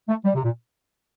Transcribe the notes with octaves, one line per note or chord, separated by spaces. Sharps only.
A3
G3
C3
A#2